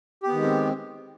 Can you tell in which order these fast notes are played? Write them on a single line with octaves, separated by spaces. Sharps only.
G4 B3 D#3 G#3 C4